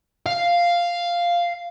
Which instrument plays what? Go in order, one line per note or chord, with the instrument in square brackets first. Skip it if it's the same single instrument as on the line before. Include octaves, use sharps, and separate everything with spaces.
[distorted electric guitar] F5